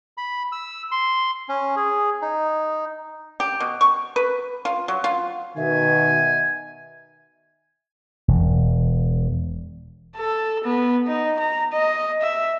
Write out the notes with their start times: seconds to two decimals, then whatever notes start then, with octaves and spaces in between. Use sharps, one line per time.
0.17 B5
0.52 E6
0.91 C6
1.49 C#4
1.76 G#4
2.22 D#4
3.40 G4
3.60 B2
3.81 C#6
4.16 B4
4.65 F4
4.88 F#3
5.04 F4
5.57 B2 D#3 E5 G#5
8.28 E1
10.17 A4
10.64 B3
11.07 D#4
11.39 A#5
11.73 D#5
12.21 E5